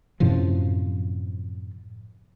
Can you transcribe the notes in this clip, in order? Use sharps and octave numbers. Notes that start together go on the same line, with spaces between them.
F#2 A2 C3 F3